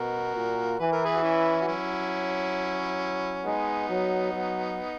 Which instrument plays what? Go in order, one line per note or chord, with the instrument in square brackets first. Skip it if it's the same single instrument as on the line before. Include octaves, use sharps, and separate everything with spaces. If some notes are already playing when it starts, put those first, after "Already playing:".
Already playing: [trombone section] B2 [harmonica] F#4 A#4
[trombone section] A#2
[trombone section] E3 [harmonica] B4
[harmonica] A#4
G#4 B4
F#4
C#4 E4
F#4
[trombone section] F#3 [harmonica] C#4 E4
[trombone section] G#3 [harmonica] B3 D#4
[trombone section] F#3
F#3